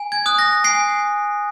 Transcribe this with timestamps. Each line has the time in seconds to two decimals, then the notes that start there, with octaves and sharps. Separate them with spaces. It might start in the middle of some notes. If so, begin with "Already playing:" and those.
Already playing: G#5
0.12 G#6
0.26 D#6 F#6
0.39 A#6
0.64 G#5 C7